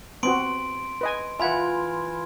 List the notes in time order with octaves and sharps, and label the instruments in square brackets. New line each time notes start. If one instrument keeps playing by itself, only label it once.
[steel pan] B3 C4 F#4 [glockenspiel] C6 D7
[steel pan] B4 D#5 G#5
[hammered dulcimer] E3 F4 [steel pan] E5 F#5 [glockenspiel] G#5 B5 G#6